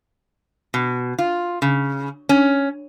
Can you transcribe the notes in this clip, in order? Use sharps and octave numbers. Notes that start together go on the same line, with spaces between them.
B2
F4
C#3
C#4